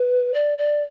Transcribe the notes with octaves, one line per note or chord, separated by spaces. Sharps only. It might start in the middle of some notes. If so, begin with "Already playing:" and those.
Already playing: B4
D5
D5